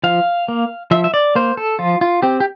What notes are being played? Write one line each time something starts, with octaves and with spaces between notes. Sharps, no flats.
F3 F5
A#3
F3 E5
E5
D5
A#3 C5
A4
F3 F4
F4
C4 G4
G4